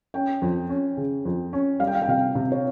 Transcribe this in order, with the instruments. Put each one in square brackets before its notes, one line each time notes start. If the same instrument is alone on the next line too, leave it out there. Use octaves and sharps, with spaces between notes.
[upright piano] C#4 [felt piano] G5
[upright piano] F2
C#4
C#3
F2
C#4
[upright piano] G3 [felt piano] F5
[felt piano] G5
F5
G5
[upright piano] C3 [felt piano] F5
[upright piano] C3
[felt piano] C#5